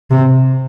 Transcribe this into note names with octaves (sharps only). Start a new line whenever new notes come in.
C3